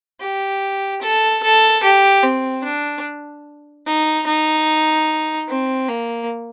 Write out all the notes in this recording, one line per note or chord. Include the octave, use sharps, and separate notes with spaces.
G4
A4
A4
G4
C4
D4
D#4
D#4
C4
A#3